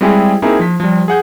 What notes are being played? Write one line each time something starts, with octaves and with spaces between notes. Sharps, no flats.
G3 G#3 C4 E4 G4 G#4
A#3 C4 D#4 E4 G#4
F3 B6
F3 G3
G#4 F#5 G6